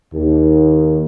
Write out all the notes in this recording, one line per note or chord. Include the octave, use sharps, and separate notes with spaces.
D#2